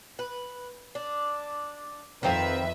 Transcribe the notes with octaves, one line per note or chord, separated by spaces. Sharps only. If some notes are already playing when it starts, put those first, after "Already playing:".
B4
D4
F2 D#3 C4 B4 E5 F5